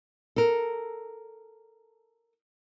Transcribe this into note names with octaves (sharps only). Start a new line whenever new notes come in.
A4 A#4